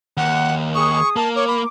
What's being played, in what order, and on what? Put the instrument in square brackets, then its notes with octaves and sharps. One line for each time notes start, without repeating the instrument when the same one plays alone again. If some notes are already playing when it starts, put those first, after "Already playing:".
[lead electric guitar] D#2 [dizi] F#5
[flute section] G#4 D#6 [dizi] C#6
[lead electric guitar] A#3 [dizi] A5
[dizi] C#5 [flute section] D6
[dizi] B5